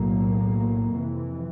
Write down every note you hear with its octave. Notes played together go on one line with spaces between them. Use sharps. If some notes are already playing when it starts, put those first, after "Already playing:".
Already playing: B1 A2 F#3 A#3
F2 C3 E3